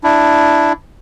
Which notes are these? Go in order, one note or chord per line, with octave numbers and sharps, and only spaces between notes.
D4 E4